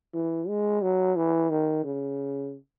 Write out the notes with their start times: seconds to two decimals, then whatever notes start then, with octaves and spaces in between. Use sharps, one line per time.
0.14 E3
0.48 G#3
0.82 F#3
1.16 E3
1.50 D#3
1.84 C#3